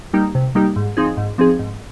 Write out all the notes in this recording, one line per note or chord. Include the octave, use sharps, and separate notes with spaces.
G3 A#3 D#4 G4
C3
G3 A#3 D#4 G4
G#2
F3 C4 D#4 G#4
G#2
F3 C4 D#4 G#4
G#2